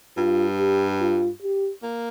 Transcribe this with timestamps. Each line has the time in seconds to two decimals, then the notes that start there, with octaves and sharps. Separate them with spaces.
0.17 G2 F4
0.59 G4
1.01 F4
1.42 G4
1.83 A#3